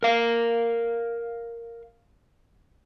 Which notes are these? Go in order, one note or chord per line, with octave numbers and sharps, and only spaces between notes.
A#4 F5